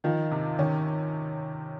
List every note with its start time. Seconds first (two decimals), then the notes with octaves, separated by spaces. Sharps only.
0.04 D#3 F3
0.31 C3
0.59 D#3 C#4